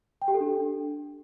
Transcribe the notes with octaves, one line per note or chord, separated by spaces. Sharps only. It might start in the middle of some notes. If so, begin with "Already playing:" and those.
G5
G4
A4
D4